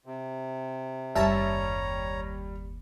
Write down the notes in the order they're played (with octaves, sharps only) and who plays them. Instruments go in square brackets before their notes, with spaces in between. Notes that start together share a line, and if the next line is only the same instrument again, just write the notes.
[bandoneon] C3
[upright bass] F#1 D#2 [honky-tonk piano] G3 [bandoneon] C#5 A#5 [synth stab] E5 A5